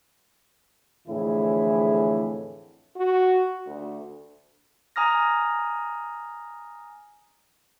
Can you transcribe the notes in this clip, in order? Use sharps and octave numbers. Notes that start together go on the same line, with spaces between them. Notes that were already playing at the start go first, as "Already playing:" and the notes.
F2 A2 D3 E3 E4 G#4
F#4
D2
G#5 A#5 D#6 F6 A#6